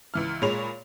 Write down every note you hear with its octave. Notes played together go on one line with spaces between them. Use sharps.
C#2 E3 F6
A#2 G#3 C#5 B5 F7